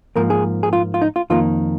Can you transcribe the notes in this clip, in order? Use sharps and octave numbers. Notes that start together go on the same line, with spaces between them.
G#2 F3 A#3 A#4
G#4
G#4
F4
F4
D#4
F4
F2 D#3 A#3 F4